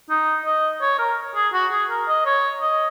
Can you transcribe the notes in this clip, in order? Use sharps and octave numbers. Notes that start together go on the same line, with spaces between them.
D#4
D#5
C#5
A#4
G#4
F#4
G#4
A#4
D#5
C#5
D#5